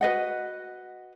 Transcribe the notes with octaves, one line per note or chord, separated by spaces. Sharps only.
F#4 B4 D#5 F#5